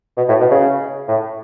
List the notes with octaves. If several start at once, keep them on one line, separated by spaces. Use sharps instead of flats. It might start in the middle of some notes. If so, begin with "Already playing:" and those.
B2
A2
B2
C#3
A2